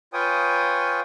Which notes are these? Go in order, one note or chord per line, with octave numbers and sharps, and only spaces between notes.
F4 B4 C#5 G5 G#5 D#6